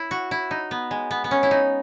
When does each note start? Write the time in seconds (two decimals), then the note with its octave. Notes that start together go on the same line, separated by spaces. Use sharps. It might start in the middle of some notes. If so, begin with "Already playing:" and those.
Already playing: E4
0.11 F#4
0.31 E4
0.51 D#4
0.71 B3
0.91 G#3
1.11 B3
1.24 B3
1.31 C#4
1.43 E4
1.51 D#4